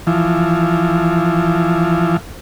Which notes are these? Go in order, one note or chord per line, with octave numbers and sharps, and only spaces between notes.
E3 F3